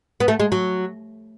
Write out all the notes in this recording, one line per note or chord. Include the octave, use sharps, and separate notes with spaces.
B3
A3
G#3
F#3